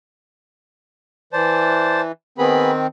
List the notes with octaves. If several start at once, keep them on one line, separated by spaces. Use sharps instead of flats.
E3 C5 D5 A5
D#3 B3 C4 G#4 B5